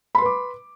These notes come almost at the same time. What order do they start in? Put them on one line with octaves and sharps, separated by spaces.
B5 C6 B4 D6